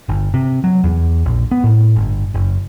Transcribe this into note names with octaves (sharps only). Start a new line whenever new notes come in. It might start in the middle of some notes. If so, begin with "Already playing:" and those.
G1
C3
F#3
E2
A#1
B3
A2
G1
F#1